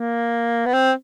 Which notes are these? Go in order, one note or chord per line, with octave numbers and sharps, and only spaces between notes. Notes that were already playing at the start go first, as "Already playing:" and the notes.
Already playing: A#3
B3
C4